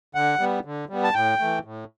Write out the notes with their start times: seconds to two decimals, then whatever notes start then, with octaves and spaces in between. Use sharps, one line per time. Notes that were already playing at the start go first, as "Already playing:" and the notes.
0.15 D3 F#5
0.39 G3 B3
0.65 D3
0.89 G3 B3
1.03 A5
1.14 A2 G5
1.39 E3 A3
1.65 A2